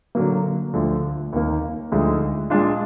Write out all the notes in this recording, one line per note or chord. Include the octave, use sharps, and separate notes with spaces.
D3 F#3 A#3
D2 D3 F3
D#2 D#3 A#3
D2 D3 F3 G#3 D#4
A#2 G#3 D4 F4